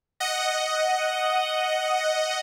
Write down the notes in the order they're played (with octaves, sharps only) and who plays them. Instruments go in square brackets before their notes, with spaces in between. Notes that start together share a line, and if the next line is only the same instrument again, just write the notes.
[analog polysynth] D#5 F#5